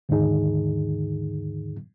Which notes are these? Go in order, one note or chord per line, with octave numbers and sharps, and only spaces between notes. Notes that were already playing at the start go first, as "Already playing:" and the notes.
D#2 G#2 D3 D#3 D#4 G#4